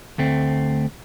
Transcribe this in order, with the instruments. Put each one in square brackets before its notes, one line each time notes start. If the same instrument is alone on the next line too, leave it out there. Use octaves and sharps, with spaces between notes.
[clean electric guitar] D2 A3 C4